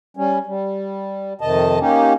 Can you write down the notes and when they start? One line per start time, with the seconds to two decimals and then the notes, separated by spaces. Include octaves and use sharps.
0.17 G3 C#4
0.46 G3
1.41 F2 C3 D#3 D#5 A5
1.80 A#3 C#4 D#4 G4